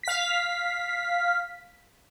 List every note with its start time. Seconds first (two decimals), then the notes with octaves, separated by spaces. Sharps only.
0.03 F5 B6